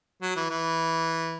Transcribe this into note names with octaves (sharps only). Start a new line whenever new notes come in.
F#3
E3
E3